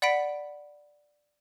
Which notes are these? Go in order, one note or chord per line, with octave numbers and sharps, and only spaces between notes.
D5 F#5 B5 B6 D7